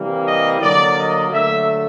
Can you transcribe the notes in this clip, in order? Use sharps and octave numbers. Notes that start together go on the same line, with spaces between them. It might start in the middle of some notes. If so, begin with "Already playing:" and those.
Already playing: C3 E3 G3 A#3
D#5
D3 F#3 A#3 D5
D#5
D3 F#3 A3 E5